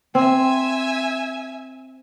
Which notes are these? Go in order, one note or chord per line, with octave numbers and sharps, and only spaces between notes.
C4 E5 G#5